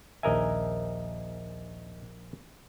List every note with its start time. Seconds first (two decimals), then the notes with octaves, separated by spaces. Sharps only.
0.23 A#1 D#2 A#4 D#5 E5 G#5